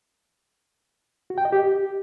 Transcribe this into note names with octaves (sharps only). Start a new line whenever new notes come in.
F#4
G5
D#5
G4